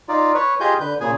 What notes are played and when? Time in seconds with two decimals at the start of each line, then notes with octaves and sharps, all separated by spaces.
0.09 D#4 F4 D5
0.35 B4 C#5
0.60 F4 G4 G#4 D#5 G#5 G6
0.80 D3 B4 G6
1.01 A#2 C#3 G#4 G#5